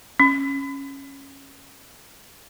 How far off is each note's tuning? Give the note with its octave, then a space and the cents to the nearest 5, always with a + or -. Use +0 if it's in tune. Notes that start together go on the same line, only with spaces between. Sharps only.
C#4 -10